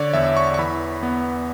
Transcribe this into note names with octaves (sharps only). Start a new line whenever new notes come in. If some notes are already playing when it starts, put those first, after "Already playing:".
Already playing: D3 C#5 D5
E2 E5
C#6
C#6
E3 B5
B3